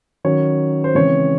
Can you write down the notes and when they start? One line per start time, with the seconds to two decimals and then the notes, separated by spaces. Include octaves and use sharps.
0.24 D#3 F#3 C#4 C#5
0.84 C5
0.95 C#3 E3 G#3 C4 C#5